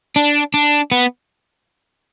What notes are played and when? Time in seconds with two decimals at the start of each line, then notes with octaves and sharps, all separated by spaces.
0.16 D4
0.54 D4
0.92 B3